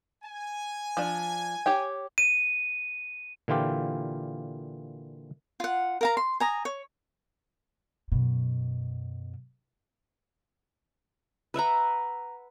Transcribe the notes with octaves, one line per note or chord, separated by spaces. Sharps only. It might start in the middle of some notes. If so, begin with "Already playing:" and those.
G#5
F3 D4
G4 C#5 G5
D#7
A#2 D3 E3 F4 G4
F4 F#5
A#4 F5 A#5
C6
G#5 A#5 D#6
C#5
F#2 B2
B4 E5 F#5 A#5